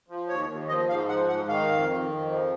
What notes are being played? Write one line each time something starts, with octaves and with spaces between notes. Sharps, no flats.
F3
D#2 C#5
D#2
F3 D#5
G#2 F5
F3 F#5
G#2 F#5
D#3 F5
F2
D#3
F2
F3